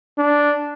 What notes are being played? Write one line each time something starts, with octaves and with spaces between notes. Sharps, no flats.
D4